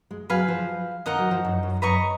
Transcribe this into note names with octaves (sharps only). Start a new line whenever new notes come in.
G#3
F#3 B4 F5 G#5
F3
D#3 D#4 A#4 D#5 F#5
F#3
F3
F#2
F#2
F#2 B4 D#5 A#5 C#6